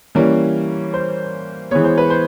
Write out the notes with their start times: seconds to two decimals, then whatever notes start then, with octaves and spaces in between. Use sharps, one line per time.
0.15 E3 G3 A#3 C#4
0.94 C5
1.71 E3 G#3 B3 C#5
1.84 C5
1.98 B4
2.10 C5